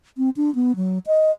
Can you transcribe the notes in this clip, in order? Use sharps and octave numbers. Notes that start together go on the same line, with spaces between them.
C4
D4
B3
F#3
D#5